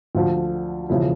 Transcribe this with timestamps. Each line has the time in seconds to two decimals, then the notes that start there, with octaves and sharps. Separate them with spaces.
0.15 D2 D3 F3 F4
0.89 E1 C#3 F3 E4